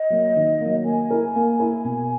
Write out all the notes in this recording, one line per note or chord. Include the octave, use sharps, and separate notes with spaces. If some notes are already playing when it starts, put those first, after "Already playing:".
Already playing: D#5
F#3 A#3
D#3
F#3 A#3
A#3 G#5
E4 A#4
A#3
E4 A#4
B2